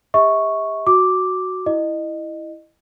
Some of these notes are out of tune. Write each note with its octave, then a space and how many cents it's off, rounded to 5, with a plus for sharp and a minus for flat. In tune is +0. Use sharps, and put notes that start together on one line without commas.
G4 +45 E5 -40 C#6 +0
F#4 +0 D6 +0
E4 +0 D#5 -20